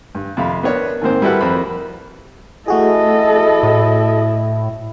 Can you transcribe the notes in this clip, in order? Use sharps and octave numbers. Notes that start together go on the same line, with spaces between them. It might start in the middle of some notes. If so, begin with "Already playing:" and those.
G2
F2 C3 F5 B5
B3 D4 A#4 B4 C#5
G#2 D#3 A#3 C4 C5
G3 E4 F#4 A4 B4 F#5
F2 A#4 C5 B5
A3 E4 F#4 G#4 A4 D#5
A2